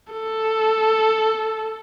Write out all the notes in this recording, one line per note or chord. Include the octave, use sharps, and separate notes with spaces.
A4